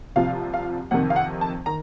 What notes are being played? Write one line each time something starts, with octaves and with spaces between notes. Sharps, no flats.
C2 C3 F3 F5
F5
F2 C3 D#3 F#5
F5
F#5
A5
D#3 A#5